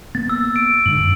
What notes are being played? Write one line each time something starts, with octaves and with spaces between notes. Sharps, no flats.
A#3 B3 A6
E6
D7
G#2 D3 F#7
F#2